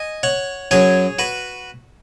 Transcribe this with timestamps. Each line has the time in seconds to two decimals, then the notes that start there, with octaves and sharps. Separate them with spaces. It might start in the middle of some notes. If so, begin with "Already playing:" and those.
Already playing: D#5 G#5
0.23 C#5 F#5
0.71 F#2 F#3 G#4 C#5
1.19 F#4 B4